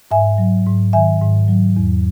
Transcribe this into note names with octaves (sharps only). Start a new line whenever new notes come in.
G#2 E5 G#5
F#3
G#2
D#3 E5 G#5
G#2
F#3
E2